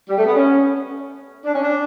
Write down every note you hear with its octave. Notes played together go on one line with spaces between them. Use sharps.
G3
A3
B3
C#4
D4
C#4
D4